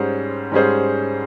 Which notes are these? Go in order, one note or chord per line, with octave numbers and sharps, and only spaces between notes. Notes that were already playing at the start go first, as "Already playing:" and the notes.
Already playing: G#2 G3 C#4 G#4 C5
G#2 G3 C#4 G#4 C5